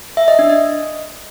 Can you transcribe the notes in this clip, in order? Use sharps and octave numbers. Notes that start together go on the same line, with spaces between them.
E5
D#5
D4
D#5